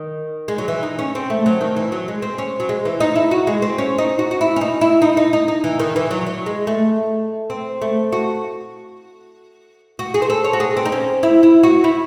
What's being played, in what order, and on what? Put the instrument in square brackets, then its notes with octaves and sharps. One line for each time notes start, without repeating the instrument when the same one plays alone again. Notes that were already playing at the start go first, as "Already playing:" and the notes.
Already playing: [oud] D#3
G#3
F#3
E3
D#4
C#4
C4
A3
F#3
D#3
E3
F#3
G#3
C4
C#4
F#3
G#3
E3
D#4
E4
F#4
G#3
C4
C#4
D#4
F#4
F#4
E4
C#4
D#4
E4
D#4
D#4
D#4
D#4
E3
D#3
E3
F#3
F#3
G#3
A3
C4
A3
F#4
F#4
G#4
C5
A4
C#5
F#4
G#4
C4
D#4
C#4
E4
E4
F#4
E4